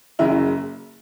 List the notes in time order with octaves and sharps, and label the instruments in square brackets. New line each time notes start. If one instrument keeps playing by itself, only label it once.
[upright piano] F#1 F#2 C#3 E4